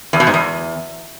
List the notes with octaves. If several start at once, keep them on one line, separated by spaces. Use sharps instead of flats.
E2
B2
G#2
E2